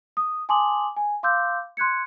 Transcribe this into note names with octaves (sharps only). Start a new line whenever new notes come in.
D#6
G#5 A5 C6 D6 D#6 F#7
G#5
F5 C6 D6 E6 G6
C6 F#6 G#6 C#7